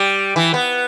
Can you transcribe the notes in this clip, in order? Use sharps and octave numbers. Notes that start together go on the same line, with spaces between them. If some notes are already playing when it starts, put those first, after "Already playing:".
Already playing: G3
E3
B3